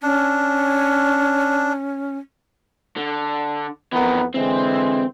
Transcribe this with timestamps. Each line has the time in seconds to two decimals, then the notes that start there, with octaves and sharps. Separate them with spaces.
0.03 C#4 D4
2.96 D3
3.93 F2 E3 B3 A#4
4.34 D3 E3 G#3 C4